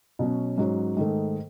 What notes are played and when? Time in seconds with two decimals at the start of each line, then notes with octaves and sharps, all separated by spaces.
0.19 B2 F#3 C#4
0.58 G#2 F#3 C#4
0.97 G#2 D#3 A3